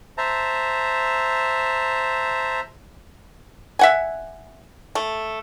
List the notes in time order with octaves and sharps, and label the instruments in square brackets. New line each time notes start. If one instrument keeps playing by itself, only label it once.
[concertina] C5 E5 A5 A#5
[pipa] E5 F#5 G#5
A3